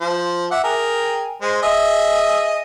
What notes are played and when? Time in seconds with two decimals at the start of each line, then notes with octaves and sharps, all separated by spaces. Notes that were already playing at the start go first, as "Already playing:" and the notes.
0.01 F3 C5
0.51 E5 F#5 D6
0.64 G#4 A#4 G5
1.42 G#3 C5
1.63 G#4 D#5 E5